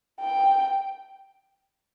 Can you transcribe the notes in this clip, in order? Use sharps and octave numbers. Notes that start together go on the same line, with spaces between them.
G5